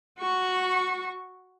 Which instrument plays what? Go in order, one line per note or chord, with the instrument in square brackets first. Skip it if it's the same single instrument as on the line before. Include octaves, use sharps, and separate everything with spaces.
[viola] F#4 C#6